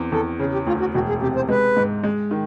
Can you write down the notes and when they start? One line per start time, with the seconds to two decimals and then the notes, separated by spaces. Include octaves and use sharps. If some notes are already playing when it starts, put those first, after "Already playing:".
Already playing: E2 C4
0.12 E2 A4
0.40 C#3 G#4
0.53 G4
0.67 D2 F4
0.80 F#4
0.94 E1 F#4
1.09 G#4
1.22 C3 G4
1.36 C5
1.49 G#3 B4
1.77 G#2
2.04 G#3
2.31 D#3